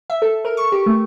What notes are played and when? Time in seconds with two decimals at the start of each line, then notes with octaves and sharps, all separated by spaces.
0.10 E5
0.22 A4
0.45 A#4
0.57 C#6
0.72 G4
0.86 A3